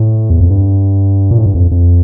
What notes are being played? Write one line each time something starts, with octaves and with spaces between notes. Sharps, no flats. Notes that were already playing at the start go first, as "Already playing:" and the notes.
Already playing: A2
E2
F2
G2
A#2
A2
G2
F2
F2